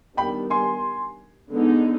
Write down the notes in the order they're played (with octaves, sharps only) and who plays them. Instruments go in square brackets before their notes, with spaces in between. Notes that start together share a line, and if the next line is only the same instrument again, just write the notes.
[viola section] D#3 G3 B3 D4 [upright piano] G5 B5
[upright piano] G#5 C6
[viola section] D3 G#3 B3 D#4